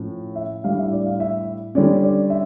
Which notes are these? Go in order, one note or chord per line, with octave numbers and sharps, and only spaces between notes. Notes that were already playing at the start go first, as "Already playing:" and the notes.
Already playing: A2 F3 C#4
E5
A2 G3 D4 F5
E5
D5
F5
E5
D3 G3 C#4 D5
D5
E5